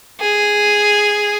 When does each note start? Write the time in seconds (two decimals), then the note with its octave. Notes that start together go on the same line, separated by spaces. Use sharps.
0.20 G#4